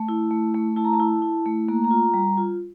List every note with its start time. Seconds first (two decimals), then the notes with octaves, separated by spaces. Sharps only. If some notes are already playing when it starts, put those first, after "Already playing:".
Already playing: A3 A5
0.09 E4
0.31 A3
0.54 A3
0.76 E4 A5
0.85 A#5
0.94 A5
1.00 E4
1.22 E4
1.46 A3
1.68 A#3 A#5
1.84 A#5
1.91 F4
2.14 G3
2.37 F4